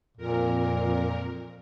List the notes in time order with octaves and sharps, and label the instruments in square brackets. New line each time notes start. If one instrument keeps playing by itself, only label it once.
[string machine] F2 A#4 [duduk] A#2